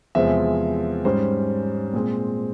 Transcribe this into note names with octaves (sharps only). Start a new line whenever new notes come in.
E2 C3 F3 G#3 C4 E5
G#2 G3 C#4 C5
A#2 G#3 C4